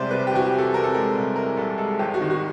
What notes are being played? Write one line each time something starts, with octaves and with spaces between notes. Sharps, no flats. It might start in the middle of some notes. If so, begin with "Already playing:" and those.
Already playing: C2 C3 G#3 C5 D5
C3 B4
G4
E3 F#4
G4
E3
A4
C3 A#4
A4
G#3 A#4
C2
E3 A#4
C2 A4
G#3 A4
G#1 G4
F#4
D#3
F#4